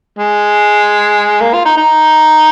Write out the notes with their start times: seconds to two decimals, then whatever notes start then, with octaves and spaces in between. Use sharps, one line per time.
0.18 G#3
1.41 A#3
1.54 F4
1.65 D#4
1.78 D#4